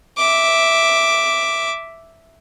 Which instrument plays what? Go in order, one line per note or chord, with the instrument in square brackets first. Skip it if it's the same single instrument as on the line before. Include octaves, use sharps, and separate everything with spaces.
[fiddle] E5 D6